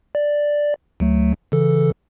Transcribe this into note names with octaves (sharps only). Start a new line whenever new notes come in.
D5
D2 F#3 A3
C#3 E3 A4